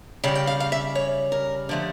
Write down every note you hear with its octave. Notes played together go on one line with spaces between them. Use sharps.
C#3 G3 G5
G5
F5
F5
E5
C#5
A#4
D3 F3 A3